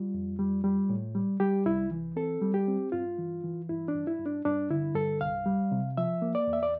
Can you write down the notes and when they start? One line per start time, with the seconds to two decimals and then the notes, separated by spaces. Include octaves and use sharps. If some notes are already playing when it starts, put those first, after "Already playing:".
Already playing: G3 F4
0.14 F2
0.39 G3
0.64 G3
0.90 A2
1.15 G3
1.40 G3 G4
1.66 C2 E4
1.91 E3
2.16 C4 A4
2.41 G3
2.54 G4
2.68 C4
2.92 G2 F4
3.19 E3
3.44 E3
3.69 G2 E4
3.88 D4
3.94 G2
4.07 E4
4.19 G2
4.26 D4
4.45 G2 D4
4.70 D3 E4
4.95 G2 A4
5.20 C2 F5
5.46 G3
5.72 C3
5.97 F3 E5
6.22 A#3
6.35 D5
6.47 E2
6.53 E5
6.63 D5